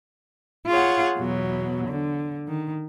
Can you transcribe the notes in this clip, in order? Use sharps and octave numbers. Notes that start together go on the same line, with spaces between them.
F4 G#4 C#5 F#5
E2 B2 F#3
D3
D#3